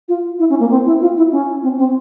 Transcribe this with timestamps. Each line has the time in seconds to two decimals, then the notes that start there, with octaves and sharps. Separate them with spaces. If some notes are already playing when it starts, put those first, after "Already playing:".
0.09 F4
0.39 E4
0.50 C#4
0.60 A#3
0.70 C4
0.86 E4
1.01 F4
1.17 E4
1.32 C#4
1.63 C4
1.78 C4